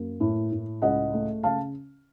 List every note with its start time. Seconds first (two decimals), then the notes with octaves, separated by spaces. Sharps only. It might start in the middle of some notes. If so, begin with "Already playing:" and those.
Already playing: F#2 A#3
0.20 A2
0.52 A2
0.82 C#2 D#5 F#5
1.13 A3
1.43 C#3 F5 A5